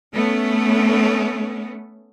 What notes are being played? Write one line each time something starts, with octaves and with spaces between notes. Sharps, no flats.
A3 B3 C#4